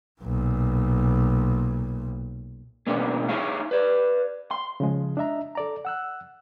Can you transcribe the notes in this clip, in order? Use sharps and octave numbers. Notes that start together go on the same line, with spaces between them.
B1 A#2
B2 G#3 A#3 C#4 D4
D#4 E4 G#4 C#5 E5 F5
B4 D5
C6
C#3 F3 G#3
D4 D#5 E5 A#5
A4 D5 A#5
F#5 E6 F#6